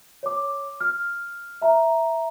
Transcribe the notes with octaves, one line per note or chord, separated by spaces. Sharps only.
C#5 D6
F6
E5 A#5